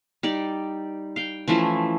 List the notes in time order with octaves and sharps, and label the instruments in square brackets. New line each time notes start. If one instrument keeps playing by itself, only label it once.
[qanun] G3 D#4 D5
F5 G5
E3 F3 A3 C#4